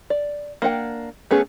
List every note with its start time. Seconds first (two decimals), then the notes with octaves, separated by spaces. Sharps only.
0.10 D5
0.62 A#3 D4 F#5 G5
1.31 A3 B3 C#4 G#4